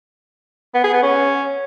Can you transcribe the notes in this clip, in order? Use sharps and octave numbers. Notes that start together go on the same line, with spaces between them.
B3
G#4
B3
C#4